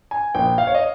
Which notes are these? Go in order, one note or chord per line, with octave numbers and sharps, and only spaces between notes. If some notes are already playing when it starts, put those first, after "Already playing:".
G#5
A#1 G5
F5
C#5
D#5